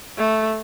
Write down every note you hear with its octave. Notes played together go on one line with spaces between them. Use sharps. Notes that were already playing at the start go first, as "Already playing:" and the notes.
A3